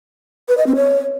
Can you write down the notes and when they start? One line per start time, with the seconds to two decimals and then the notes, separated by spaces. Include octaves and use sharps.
0.49 B4
0.58 D#5
0.67 C4
0.76 C#5